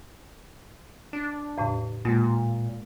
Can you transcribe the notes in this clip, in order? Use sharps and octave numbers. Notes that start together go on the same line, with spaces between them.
D4
E2 A2 C#3
A#2 G#3 A#3 F4